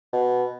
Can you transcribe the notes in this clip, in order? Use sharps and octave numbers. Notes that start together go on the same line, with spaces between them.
B2